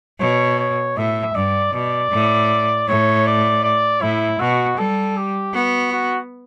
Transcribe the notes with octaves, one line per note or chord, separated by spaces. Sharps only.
B2 C#5
C#5
A2 E5
G2 D5
B2 D5
A2
A2 C#5
D5
D5
A2 E4
B2 F#4
G3 A4
G4
B3 F#4
F#4